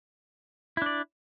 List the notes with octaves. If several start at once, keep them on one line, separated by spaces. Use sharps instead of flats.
D4 E4 D5